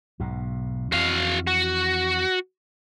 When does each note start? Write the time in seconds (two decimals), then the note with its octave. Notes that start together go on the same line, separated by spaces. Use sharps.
0.20 B1 G#2 B2
0.92 F2 E3 F#4 F5
1.47 F#4